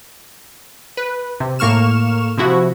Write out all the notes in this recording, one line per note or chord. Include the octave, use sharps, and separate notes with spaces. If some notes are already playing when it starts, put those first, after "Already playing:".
B4
C3
A2 A#3 C#6 F6 E7
C3 F3 E4 F#4